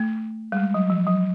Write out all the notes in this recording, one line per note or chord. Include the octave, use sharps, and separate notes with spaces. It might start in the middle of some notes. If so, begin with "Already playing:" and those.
Already playing: A3
G3
G#3
F#3
F3
F#3